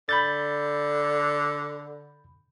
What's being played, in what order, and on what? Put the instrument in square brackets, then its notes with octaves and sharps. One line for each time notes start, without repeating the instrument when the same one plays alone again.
[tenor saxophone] D3 [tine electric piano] B5 G6 A6